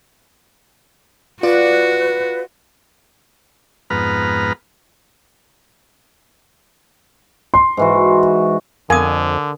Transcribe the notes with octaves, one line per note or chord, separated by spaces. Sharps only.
F4 F#4 B4 D5
F2 G#2 B3 B4 A#5 F6
C6
G#2 E3 F#4
F2 D3 A#4 G#5 D#6